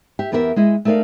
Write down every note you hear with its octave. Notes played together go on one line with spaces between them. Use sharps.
G4 E5
E2 B3 G4 A#4 C#5 E5
G#3 E4 D#5
A3 D#4 A#4 C#5 D5 F5